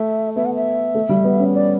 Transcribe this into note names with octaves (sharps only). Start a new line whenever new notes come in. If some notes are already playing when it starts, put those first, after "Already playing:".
Already playing: A3 E5
B3 E5
F#5
E5
A3
G3
B3
C#4
D5